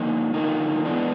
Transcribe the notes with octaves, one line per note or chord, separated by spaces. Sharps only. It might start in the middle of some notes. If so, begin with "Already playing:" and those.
Already playing: D3 F3 A#3 D#4
D3 F3 A#3 D#4
E3 G#3 B3 D4